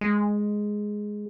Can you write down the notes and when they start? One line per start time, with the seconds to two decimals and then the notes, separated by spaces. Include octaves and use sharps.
0.01 G#3